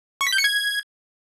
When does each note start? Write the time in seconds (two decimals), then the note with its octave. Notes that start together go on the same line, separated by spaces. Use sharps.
0.21 C#6
0.27 B6
0.32 G6
0.38 C#7
0.44 G#6